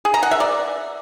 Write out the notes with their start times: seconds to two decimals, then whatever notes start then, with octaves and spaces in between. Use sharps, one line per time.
0.05 G#4
0.14 A#5
0.23 F#5
0.31 E5
0.40 D5